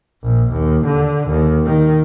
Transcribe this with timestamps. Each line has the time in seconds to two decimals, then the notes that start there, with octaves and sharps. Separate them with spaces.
0.24 A#1
0.53 D#2
0.86 D3
1.30 D#2
1.66 D#3